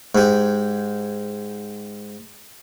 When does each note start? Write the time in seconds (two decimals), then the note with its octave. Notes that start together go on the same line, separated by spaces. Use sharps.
0.15 G#2 G4